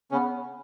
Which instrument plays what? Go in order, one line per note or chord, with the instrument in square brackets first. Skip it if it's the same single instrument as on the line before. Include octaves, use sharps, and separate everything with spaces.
[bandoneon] C#3 C#4 [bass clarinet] B3